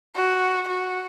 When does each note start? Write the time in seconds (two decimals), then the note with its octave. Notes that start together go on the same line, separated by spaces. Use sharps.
0.15 F#4
0.67 F#4